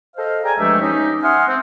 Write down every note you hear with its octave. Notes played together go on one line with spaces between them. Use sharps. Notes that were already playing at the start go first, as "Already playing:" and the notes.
A4 C5 D#5 F5
G#4 D5 G5 G#5 A#5
G2 F3 G#3 A3 G4 E5
C#4 D#4 G4
E5 F#5 G#5 C6 D#6 F6
C4